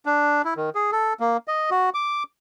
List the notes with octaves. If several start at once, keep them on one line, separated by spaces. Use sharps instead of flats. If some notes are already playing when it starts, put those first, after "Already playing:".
D4
E4
D#3
G#4
A4
A#3
D#5
F#4
D6